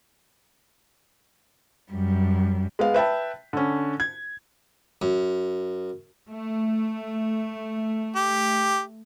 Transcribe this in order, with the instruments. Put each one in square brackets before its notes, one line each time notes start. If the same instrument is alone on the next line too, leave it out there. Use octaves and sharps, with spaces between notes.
[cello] F#2 G3
[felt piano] G#3 B3 F5
B4 E5 G5 A5
D3 C#4
G#6
[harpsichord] F#2
[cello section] A3
[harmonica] G4